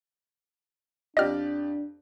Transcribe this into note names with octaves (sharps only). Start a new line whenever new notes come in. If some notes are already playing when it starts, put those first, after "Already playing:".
F2 D4 G4 D5 D#5 F6